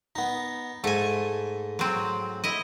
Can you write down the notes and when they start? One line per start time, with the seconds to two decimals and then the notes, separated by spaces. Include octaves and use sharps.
0.16 B3 D#4
0.84 G#2 A3 G#5
1.79 F#3 C4
2.44 E4 D#5